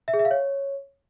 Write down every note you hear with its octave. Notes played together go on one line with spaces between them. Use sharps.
E5
G#4
E5
F5
C#5